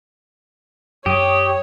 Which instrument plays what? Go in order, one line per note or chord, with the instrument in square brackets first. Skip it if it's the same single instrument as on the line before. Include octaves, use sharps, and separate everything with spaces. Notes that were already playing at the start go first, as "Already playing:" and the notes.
[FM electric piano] F#2 D#6 [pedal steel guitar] G4 [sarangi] C#5